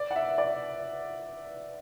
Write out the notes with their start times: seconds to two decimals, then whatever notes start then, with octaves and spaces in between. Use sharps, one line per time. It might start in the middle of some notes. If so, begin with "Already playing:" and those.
Already playing: D5
0.11 F#5
0.16 E5
0.38 D5